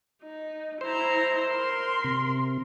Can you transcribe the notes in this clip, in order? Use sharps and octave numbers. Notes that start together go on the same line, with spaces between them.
D#4
E4 C5 A#5
A#4 C6
C3